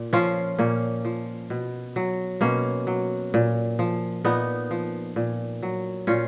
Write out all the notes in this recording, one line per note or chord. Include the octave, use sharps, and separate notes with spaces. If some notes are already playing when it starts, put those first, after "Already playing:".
Already playing: A#2
F3 C#4 F4
A#2 A#3 C#4
F3
B2
F#3
B2 A#3 C#4
F#3
A#2
F3
A#2 B3 D#4
F3
A#2
F#3
A#2 C#4 F4